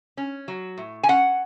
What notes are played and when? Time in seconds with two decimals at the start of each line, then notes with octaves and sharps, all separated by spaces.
0.17 C#4
0.48 F#3
0.77 A2
1.03 G#5
1.08 C#4 F#5